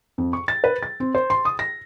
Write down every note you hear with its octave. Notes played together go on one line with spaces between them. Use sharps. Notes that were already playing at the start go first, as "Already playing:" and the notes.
F2
C#6
A6
B4
A6
C4
C5
C6
D#6
A#6